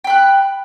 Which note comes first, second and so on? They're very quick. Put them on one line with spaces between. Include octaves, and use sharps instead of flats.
G5 B5 F#6